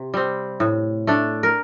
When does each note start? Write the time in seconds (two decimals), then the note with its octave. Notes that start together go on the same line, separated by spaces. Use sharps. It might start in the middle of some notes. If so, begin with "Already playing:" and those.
Already playing: C3
0.14 G3 C4
0.60 A2
1.07 A3 D4
1.43 A#4